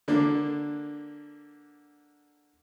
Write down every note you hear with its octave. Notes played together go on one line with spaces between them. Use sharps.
D3 A#3 D4